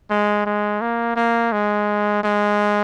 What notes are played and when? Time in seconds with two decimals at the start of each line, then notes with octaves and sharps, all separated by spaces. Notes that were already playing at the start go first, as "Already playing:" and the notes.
0.10 G#3
0.46 G#3
0.81 A#3
1.16 A#3
1.52 G#3
2.23 G#3